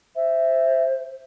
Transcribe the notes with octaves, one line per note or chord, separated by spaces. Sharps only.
C5 E5